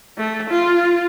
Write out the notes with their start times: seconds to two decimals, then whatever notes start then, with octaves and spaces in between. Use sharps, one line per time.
0.18 A3
0.50 F4